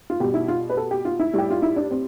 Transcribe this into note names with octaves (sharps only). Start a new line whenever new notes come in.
F4
B2 G3 G4
E4
F4
B4
A4
G4
F4
E4
A2 G3 G4
F4
E4
D4
C4